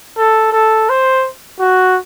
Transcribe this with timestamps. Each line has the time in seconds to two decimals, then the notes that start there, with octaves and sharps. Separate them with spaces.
0.17 A4
0.52 A4
0.89 C5
1.60 F#4